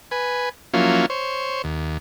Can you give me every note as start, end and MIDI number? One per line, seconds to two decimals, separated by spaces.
0.11 0.49 71
0.11 0.49 80
0.74 1.06 53
0.74 1.06 54
0.74 1.06 58
0.74 1.06 61
0.74 1.06 64
0.74 1.06 65
1.10 1.62 72
1.10 1.62 73
1.64 1.98 39